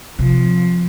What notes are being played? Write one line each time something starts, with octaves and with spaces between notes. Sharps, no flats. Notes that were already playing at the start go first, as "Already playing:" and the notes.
C3 F3